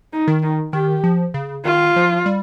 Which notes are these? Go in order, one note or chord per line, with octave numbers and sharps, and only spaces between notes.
D#4
D#3
D#4
D#3 G4
F3
C#3
D#3 F4
F3
G3